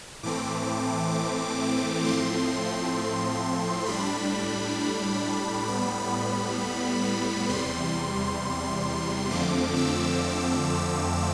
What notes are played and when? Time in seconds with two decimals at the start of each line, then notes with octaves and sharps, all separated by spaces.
0.23 A2 E3 A3 C4 D6
2.04 A2 F3 A3 C4 C6
3.86 A2 G3 D4 B5
5.67 A2 G3 B3 B5
7.49 E2 C3 G3 C6
9.30 F2 D3 F3 A3 C4 D6
9.76 E6